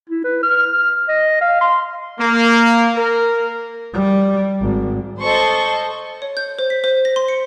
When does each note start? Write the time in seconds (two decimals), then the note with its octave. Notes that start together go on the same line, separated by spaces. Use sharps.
0.10 E4
0.24 B4
0.43 F6
1.09 D#5
1.41 F5
1.61 C6
2.19 A#3
2.96 A#4
3.93 G3
4.61 G#1
5.21 A4 C5 D#5 C#6
6.22 C#5
6.37 G6
6.59 C5
6.70 B6
6.84 C5
7.05 A#6
7.16 C6
7.28 C#7